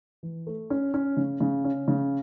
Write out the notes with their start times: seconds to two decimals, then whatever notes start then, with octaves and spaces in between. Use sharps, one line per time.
0.23 E3
0.47 A3
0.70 C#4
0.94 C#4
1.17 C#3
1.41 C#3
1.64 C#4
1.88 C#3